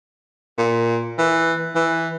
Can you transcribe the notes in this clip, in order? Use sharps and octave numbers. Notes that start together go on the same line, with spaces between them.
A#2
E3
E3